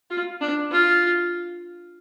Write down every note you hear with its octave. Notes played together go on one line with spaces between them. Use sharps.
F4
D4
F4